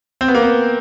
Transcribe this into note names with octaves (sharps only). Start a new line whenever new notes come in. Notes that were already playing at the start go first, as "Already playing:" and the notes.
C4
B3
A#3
B3